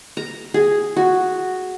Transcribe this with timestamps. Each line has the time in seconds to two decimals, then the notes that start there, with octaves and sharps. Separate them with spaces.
0.17 A#5
0.54 G#4
0.96 F#4